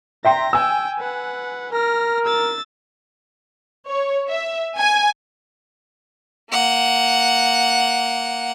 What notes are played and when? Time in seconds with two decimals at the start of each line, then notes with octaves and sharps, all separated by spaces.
0.25 E5 G5 A#5 C6 A#6
0.53 G5 G#5 E6
0.98 B4 F#5
1.73 A#4 F6 A#6
2.25 E6 A6
3.87 C#5
4.30 E5
4.77 G#5
6.51 A#3 F#5